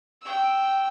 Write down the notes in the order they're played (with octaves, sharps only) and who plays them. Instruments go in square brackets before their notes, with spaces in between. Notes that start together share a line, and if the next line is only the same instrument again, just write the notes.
[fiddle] G5 E6